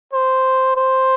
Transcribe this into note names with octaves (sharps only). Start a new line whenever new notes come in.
C5
C5